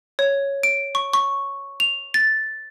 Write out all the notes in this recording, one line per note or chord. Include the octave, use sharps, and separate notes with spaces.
C#5
D7
C#6
C#6
F7
A6